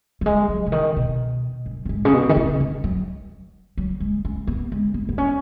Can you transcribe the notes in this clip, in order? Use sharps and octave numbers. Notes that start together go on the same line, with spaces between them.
F#3
G#3
F#3
C#3
D#3
B2
F#2
B2
G#2
C#3
B2
D#3
C#3
D#3
F#3
F#3
G#3
C#4
B3
G#3
B3
B3
C#4